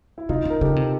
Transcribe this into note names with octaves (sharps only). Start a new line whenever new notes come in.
E4
C3 D#4 F4
C#3 A#4
C#3 G4 A4
C3